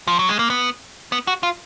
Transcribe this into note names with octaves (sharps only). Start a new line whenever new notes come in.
F3
F#3
G#3
A#3
B3
B3
F#4
F4